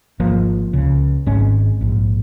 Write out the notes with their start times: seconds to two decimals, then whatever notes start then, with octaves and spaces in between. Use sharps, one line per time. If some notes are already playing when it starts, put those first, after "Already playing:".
0.19 G#1 G#2 F3 A#3
0.73 C#2 C#3
1.26 G#1 G#2 G#3 C#4
1.81 A#1 G#2